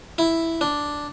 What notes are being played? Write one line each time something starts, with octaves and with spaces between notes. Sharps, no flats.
E4
D4